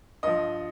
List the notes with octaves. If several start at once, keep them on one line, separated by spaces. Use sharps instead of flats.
G2 F3 D#5